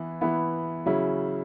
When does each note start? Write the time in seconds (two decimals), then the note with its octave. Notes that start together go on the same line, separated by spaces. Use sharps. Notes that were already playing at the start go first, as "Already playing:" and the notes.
Already playing: E3 B3 E4
0.21 E3 B3 E4
0.86 C#3 F#3 C#4 E4